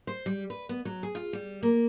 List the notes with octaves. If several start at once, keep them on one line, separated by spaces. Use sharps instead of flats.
C5
G3
B4
B3
F#3
G#4
F4
G3
A#3